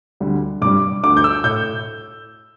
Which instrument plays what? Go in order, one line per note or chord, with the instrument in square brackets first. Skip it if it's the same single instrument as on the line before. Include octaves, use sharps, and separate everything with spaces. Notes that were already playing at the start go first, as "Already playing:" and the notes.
[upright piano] D2 D3 G3
G2 G3 D6
D2 D3 A3 D6
G6
E6
A2 G6
A3